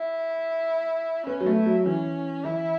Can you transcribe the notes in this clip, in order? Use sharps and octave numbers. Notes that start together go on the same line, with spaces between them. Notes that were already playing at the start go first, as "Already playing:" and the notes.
Already playing: E4
B3 C#4
F#3
A3
E4
F#3
E3 C#4
E3 E4